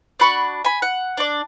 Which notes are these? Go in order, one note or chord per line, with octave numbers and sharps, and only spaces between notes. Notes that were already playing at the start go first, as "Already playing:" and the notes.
D4 F#4 B5 C#6
G#5 B5
F#5
D4 D5